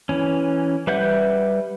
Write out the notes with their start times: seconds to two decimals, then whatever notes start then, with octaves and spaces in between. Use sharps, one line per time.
0.09 E3 C#4
0.87 G3 B4 E5 F#5 G6